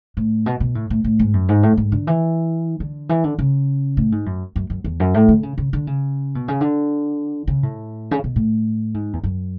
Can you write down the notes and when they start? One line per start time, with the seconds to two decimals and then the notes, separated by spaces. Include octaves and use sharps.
0.17 A2
0.46 B2
0.60 B2
0.75 A2
0.90 A2
1.04 A2
1.19 G#2
1.33 F#2
1.49 G#2
1.63 A2
1.77 G#2
1.92 D3
2.07 E3
2.80 D3
3.09 E3
3.24 D3
3.39 C#3
3.97 A2
4.12 G#2
4.26 F#2
4.56 F#2
4.70 F#2
4.84 E2
5.00 F#2
5.14 A2
5.28 D3
5.43 C#3
5.58 C#3
5.73 D3
5.87 C#3
6.35 B2
6.48 C#3
6.61 D3
7.47 C#3
7.63 A2
8.11 C#3
8.24 B2
8.36 A2
8.94 G#2
9.13 E2
9.23 F#2